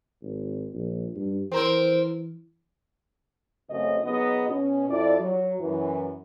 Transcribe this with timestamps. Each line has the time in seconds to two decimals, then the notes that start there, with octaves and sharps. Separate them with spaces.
0.22 G#1
0.74 A#1
1.15 G2
1.52 E3 C4 A#4 C5
3.70 F#2 C#3 A3 C4 F#4 D#5
4.03 F#3 B3 D#4 F#4 G#4 D#5
4.49 B2 C#4
4.89 F2 E4 D5
5.20 F#3
5.60 F#2 E3